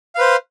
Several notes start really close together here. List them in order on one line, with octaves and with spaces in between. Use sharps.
F5 B4 C5